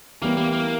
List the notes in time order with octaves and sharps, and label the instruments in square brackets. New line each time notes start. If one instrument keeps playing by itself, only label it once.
[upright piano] E3 G3 B3 [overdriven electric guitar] A#3
[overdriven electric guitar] A#3
A#3